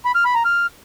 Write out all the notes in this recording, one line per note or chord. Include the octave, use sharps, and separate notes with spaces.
B5
F6
B5
A#5
F6